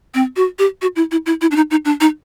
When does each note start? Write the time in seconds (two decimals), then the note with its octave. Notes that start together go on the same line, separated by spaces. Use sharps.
0.14 C4
0.36 F#4
0.59 G4
0.82 F#4
0.96 E4
1.11 E4
1.26 E4
1.41 E4
1.51 D4
1.56 D#4
1.71 D#4
1.85 D4
2.00 D#4